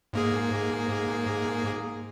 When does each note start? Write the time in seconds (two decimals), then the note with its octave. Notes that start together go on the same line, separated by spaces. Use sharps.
0.13 G#2 A#3 G#4